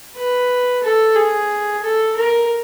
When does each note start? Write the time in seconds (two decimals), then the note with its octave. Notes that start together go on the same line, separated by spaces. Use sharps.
0.16 B4
0.83 A4
1.16 G#4
1.83 A4
2.17 A#4